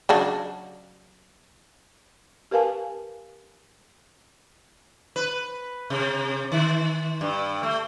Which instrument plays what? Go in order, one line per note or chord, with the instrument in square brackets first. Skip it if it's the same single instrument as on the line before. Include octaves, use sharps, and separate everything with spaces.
[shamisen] C#3 F#3 D4
[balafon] G4 A#4 B4 F5 G#5 A5
[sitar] B4
C3
D#3
G2
A3